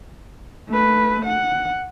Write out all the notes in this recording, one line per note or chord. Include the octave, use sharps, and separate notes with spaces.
A3 B4
F#5